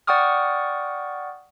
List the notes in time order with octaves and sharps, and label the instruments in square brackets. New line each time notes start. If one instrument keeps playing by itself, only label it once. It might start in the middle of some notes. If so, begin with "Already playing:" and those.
[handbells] D5 F#5 G5 C#6 D#6 F6